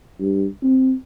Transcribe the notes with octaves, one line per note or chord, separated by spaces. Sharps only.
G2
C4